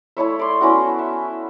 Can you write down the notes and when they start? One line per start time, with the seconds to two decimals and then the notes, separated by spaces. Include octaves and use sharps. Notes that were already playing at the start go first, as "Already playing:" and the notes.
0.17 A3 E4 C#5 E5
0.39 D5 C6
0.61 B3 C#4 E4 F#4
0.99 E5